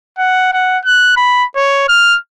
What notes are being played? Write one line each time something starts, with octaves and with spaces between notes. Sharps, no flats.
F#5
F#5
F#6
B5
C#5
F6